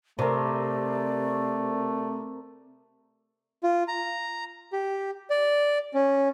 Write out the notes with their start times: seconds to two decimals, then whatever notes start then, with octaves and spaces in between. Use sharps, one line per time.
0.19 C3 A3 A#4 C5 D5
3.63 F4
3.88 A#5
4.73 G4
5.30 D5
5.94 C#4